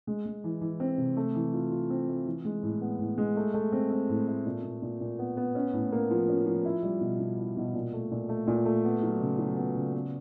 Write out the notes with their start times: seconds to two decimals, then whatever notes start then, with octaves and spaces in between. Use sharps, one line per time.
0.07 G#3
0.26 G#3
0.44 E3
0.61 E3
0.80 C4
0.98 C3
1.17 A3
1.35 E3
1.53 F4
1.71 F4
1.90 C4
2.09 A3
2.27 E3
2.45 G#3
2.63 A2
2.81 B3
2.99 A2
3.18 G#3
3.36 A3
3.54 A3
3.72 C4
3.90 C4
4.09 A2
4.28 A3
4.46 A#2
4.63 A#2
4.82 A#2
5.01 A#2
5.19 B3
5.37 B3
5.55 C#4
5.73 A2
5.92 A#3
6.11 F3
6.28 C#4
6.46 F3
6.65 E4
6.83 G3
7.01 B2
7.20 B2
7.39 E4
7.57 B2
7.74 A#2
7.93 A3
8.11 A#2
8.29 A3
8.47 A#2
8.65 A3
8.85 B3
9.03 F#3
9.21 C#3
9.39 F#3
9.57 B3
9.75 C#3
9.94 B3